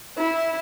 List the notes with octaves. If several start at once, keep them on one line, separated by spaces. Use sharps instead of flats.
E4